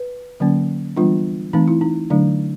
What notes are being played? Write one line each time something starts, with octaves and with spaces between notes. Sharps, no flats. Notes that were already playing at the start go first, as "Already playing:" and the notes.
Already playing: B4
D3 F#3 A#3 C#4
E3 G3 B3 D4 F4
E3 A3 C4 D#4
E4
D#4
D3 F#3 A3 D4